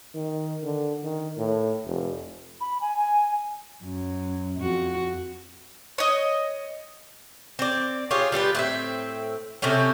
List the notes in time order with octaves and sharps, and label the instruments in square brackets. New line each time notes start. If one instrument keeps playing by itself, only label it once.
[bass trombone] D#3
D3
D#3
A2
F1
[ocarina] B5
G#5
G#5
[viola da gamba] F#2
F2 F#4
[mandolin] C#5 D#5
[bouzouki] C4 D5
F4 G4 G#4 C#5
G3 F4 G4 B4
A2 C4 E5
C3 A3 C4 C#4